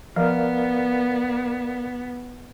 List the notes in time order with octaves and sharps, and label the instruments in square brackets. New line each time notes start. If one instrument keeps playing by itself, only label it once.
[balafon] F3 [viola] B3 [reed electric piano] A#4 D5 F5